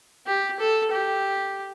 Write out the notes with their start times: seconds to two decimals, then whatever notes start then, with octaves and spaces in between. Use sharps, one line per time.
0.27 G4
0.59 A4
0.92 G4